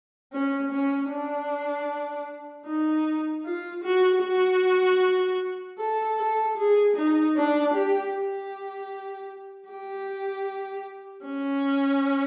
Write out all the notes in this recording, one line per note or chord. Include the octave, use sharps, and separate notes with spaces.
C#4
C#4
D4
D#4
F4
F#4
F#4
A4
A4
G#4
D#4
D4
G4
G4
G4
C#4